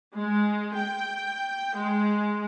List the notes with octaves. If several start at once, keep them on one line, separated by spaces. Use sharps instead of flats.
G#3
G5
G#3